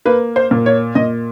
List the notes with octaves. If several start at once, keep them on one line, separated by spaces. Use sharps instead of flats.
A#3 B4
C5
A#2
C#5
A#2 D#5